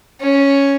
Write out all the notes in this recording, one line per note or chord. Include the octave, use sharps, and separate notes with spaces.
C#4